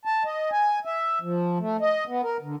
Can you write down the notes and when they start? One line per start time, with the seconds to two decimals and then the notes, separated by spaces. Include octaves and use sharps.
0.05 A5
0.25 D#5
0.52 G#5
0.85 E5
1.21 F3
1.59 A3
1.81 D#5
2.07 B3
2.23 A#4
2.42 D3